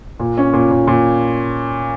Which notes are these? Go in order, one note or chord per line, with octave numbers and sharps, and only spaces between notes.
A#2
C#4
A#2
A#2
A#2